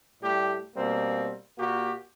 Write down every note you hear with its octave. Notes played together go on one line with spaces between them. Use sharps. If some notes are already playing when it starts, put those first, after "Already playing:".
A2 G3 G4
B2 G3 A#3 C4
A#2 A#3 F#4 G4